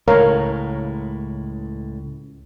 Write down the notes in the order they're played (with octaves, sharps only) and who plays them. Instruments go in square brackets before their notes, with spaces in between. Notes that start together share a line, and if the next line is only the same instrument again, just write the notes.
[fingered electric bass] C#2 A2 [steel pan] A#4 C#5 F5